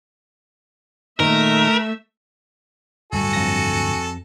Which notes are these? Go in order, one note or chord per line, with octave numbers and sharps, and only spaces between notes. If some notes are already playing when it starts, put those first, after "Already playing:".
A#2 D#3 A3 A#4 E5
D1 G2 G3 F#4 A4 G#5
F2 A#6